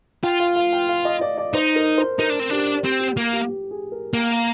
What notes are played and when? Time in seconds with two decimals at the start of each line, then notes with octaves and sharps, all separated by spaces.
0.24 F4 G5
0.40 F5
0.56 F5
0.73 G5
0.89 F5
1.05 D#5
1.21 D5
1.38 D5
1.54 D#4 C5
1.76 A#4
1.98 C5
2.19 D#4 A#4
2.30 D4
2.39 C4
2.50 D4 G4
2.84 C4 G4
3.00 G4
3.17 A#3 G4
3.33 G4
3.48 G4
3.71 G#4
3.92 A#4
4.13 A#3 G5
4.31 F5